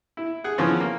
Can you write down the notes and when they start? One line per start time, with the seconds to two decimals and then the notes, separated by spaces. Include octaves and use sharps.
0.17 E4
0.44 G#4 F#5
0.58 C#3 E3 F3 B3 C#4
0.80 A#3